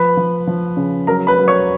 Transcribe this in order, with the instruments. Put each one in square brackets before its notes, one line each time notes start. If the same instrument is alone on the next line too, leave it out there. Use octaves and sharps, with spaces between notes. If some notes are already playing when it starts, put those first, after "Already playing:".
Already playing: [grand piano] F3 B4 B5
F3
F3
C#3
F#3 A#4 A#5
B4 B5
F#3
C#5 C#6